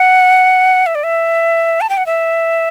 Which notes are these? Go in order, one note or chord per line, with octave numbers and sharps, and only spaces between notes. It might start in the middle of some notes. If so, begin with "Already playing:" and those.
Already playing: F#5
E5
D5
E5
A5
G5
F#5
E5